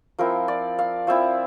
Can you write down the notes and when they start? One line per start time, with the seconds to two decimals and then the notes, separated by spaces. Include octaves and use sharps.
0.18 F3 C4 E4 A#4
0.48 D5
0.79 F5
1.07 F3 C4 E4 E5